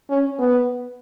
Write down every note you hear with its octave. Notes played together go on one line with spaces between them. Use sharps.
C#4
B3